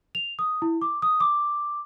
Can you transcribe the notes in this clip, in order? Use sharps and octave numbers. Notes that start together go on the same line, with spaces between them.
F7
D#6
E4
D6
D#6
D6